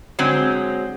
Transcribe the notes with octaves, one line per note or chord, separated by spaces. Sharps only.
D3 F#3 G#3 C4